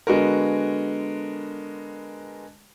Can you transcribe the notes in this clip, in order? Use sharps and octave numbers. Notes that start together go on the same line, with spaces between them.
D3 G#3 B3 F#4 A#4